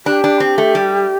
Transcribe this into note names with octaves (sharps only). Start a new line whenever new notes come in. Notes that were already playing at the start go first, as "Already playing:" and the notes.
D4 G4
D4
C4
A3
G3